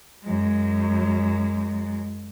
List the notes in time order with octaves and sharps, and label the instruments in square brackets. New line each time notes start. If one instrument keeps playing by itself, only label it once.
[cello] F#2 G#3